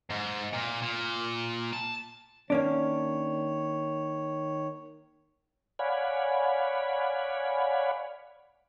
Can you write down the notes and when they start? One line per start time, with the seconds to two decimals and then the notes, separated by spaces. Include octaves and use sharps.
0.10 G#2
0.53 A#2
0.82 A#2
1.73 A5
2.50 D#3 A#3 C#4 D4 C#5
5.79 C#5 D5 F5 F#5 G#5 B5